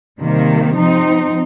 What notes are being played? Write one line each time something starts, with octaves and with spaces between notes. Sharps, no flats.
C3 D#3 G3 A#3
F3 C4 D#4